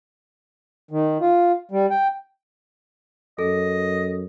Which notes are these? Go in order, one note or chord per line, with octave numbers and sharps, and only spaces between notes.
D#3
F4
G3
G5
F#2 A4 D#5